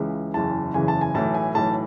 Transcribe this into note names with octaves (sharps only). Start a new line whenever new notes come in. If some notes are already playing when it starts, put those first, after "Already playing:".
Already playing: C#2 C#3 E3
F#1 E2 C#3 E3 A5
F#1 E2 C#3 E3 G#5
A5
G#5
B1 A2 E3 A5
G#5
B1 A2 E3 A5